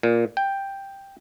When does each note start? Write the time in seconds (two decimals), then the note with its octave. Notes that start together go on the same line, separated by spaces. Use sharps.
0.03 A#2
0.37 G5